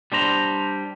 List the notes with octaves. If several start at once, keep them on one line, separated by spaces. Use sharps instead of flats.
G3 D4 C5 A#5